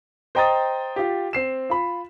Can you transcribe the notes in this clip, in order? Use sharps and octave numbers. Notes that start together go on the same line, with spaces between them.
C5 D#5 G5 A#5 D#6 A6
F4 G4
C4 C7 E7
F4 B5